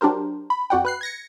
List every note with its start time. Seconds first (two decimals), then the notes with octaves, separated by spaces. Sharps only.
0.01 F#3 D4 G4 A#4 C5
0.50 B5
0.70 F2 F#4 D5 F#5 G5
0.85 B4 F#6 C7
1.01 G#6 A#6 C#7